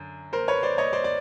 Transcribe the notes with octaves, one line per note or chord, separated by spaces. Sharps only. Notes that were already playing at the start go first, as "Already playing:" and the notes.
Already playing: F#2 D3
A#4 C5
B4 C#5
C5 D5
C#5 D#5
C5 D5
D5